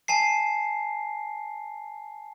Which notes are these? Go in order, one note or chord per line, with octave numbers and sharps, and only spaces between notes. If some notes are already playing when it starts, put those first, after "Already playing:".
G#5 A5 C7